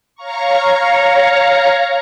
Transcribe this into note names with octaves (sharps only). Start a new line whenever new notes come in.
C#5 F5 A#5 C#6